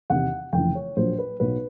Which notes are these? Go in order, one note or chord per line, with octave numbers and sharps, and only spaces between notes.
E2 C3 D#3 F#5
F1 F2 C#3 E3 G5
C#5
A#1 A#2 F#3 C5
B4
B1 B2 F#3 B4